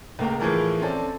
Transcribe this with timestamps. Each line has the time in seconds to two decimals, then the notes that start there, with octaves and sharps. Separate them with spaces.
0.19 C#2 A3 A#3 G5 A#5
0.40 A2 E3 F3 G#4 A#4
0.82 C4 C#4 A4 D5